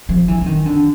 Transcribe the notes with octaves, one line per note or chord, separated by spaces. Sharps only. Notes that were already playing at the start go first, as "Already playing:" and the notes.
F3
E3
E3
D#3
D3